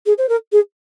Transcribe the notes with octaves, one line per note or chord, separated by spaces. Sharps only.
G#4
C5
A#4
G#4